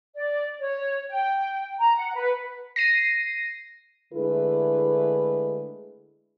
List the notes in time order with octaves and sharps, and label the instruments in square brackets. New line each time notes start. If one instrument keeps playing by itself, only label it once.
[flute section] D5
C#5
G5
A#5
F#5
B4
[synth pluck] A#6 C7 D#7
[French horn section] D3 G#3 A3 E4 G#4 B4